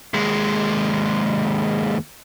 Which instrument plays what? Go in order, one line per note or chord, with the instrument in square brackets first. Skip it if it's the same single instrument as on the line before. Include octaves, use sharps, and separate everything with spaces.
[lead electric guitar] D#2 G#3